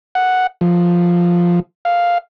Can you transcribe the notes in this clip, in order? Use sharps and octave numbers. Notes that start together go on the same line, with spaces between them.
F#5
F3
F5